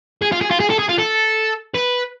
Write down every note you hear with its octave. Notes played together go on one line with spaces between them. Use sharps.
G#4
F4
G#4
F4
G#4
A4
G#4
F4
A4
B4